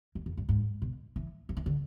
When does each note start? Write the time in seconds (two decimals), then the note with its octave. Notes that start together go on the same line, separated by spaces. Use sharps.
0.15 F2
0.26 F2
0.37 G2
0.49 G#2
0.82 B2
1.16 E3
1.49 F3
1.57 E3
1.66 D3